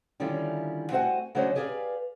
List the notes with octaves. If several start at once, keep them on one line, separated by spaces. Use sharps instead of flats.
D3 D#3 G3 C#4 E4 F4
A3 C4 F#4 C5 F#5 G#5
C#3 F#3 C#4 D4 C5 D#5
G4 G#4 B4 D5 E5 F5